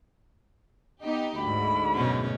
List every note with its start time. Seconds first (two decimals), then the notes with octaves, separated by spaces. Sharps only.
1.02 B3 D#4 G4
1.38 D2 G#2 B5
1.95 F#2 B2 C#4